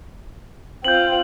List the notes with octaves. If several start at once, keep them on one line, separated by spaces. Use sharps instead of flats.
C4 F4 G6 F#7